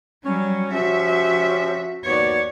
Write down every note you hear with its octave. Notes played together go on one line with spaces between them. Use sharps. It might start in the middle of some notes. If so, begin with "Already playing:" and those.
F#3 G3 C#4
F3 C#4 F#4 G4 E5
D#2 B3 F#4 C#5 D5